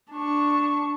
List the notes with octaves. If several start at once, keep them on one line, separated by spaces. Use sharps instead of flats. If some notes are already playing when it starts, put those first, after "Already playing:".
D4 C#6